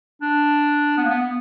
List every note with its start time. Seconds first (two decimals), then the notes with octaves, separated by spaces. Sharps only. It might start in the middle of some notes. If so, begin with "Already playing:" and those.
0.22 D4
0.98 B3
1.04 A#3
1.10 B3
1.22 B3